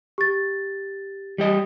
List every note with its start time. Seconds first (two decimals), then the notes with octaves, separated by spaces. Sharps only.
0.18 G4 A6
1.38 G3 G4 D#5